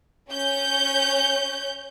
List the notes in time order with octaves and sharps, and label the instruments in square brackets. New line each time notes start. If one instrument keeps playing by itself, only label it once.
[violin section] C#4 G6